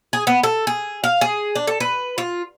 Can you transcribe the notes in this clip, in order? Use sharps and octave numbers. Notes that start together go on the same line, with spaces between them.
G#4
B3
A4
G#4
F5
G#4
D4
A4
B4
F4